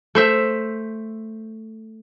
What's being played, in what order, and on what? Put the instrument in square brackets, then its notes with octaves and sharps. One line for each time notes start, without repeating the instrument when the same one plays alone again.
[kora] A3 C5 E5